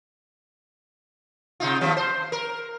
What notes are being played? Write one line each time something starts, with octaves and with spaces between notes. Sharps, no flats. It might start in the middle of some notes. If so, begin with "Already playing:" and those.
C3 D#4 F4
D#2 F3 G3
C5
A#4